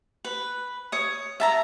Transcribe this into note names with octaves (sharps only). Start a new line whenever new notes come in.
B4
C#5 D#6
E5 A5 A#5